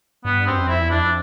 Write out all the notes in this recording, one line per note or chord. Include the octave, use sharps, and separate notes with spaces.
G2 B3
F#2 C4
F2
E4
E2
F2 D4